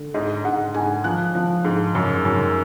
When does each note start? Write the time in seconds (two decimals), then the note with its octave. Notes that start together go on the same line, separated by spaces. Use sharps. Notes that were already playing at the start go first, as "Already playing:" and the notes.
Already playing: D3
0.14 G#2 D#5
0.45 G#2 F#5
0.74 G#2 G#5
1.04 F3 F#6
1.35 F3
1.64 G#2
1.95 F#2
2.25 F#2